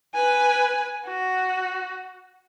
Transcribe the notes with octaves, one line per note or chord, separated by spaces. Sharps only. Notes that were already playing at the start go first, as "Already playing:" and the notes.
B4 G#5
F#4